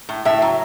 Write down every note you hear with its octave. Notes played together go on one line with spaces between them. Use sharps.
A2
A2 E5
F#3